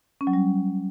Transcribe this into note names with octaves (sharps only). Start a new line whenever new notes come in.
C#4
F#3
G3